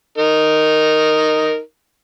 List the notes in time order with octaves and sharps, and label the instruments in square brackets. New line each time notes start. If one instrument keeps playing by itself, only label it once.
[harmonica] D#4 A#4